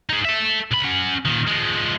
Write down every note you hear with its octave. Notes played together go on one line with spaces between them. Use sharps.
D#4 G#4
A4 E5
C2 B5
C#4 F#5
A#2 D#3
F3 G#3